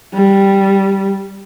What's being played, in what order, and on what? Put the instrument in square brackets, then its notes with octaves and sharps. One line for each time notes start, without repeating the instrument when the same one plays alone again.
[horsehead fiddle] G3